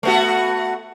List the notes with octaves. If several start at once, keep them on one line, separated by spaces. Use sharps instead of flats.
A3 B3 F#4